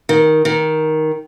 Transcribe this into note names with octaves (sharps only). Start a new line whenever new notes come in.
D#3
D#3